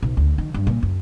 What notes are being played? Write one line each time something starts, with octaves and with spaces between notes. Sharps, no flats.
B1
D2
D#3
G2
A#2
F#2